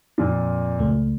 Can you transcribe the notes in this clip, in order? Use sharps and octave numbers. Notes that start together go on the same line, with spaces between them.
F2 A#2
C#2 A3